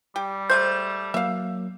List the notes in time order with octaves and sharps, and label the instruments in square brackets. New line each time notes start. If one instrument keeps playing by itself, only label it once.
[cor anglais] G3 [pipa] G4
[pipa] G#3 A3 C5 [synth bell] G6
[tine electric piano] F#3 A#3 [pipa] E5 F5